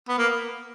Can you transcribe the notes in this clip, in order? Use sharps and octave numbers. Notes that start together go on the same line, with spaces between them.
B3
A#3